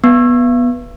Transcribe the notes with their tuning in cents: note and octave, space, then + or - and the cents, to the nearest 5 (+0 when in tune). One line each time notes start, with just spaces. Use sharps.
B3 -10